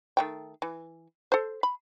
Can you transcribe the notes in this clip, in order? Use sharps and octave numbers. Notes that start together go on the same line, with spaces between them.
D#3 A3 G5
E3
A4 C5
B5